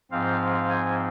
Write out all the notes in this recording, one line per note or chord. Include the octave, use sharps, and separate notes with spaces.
G#2 F3 C4 F5
G#5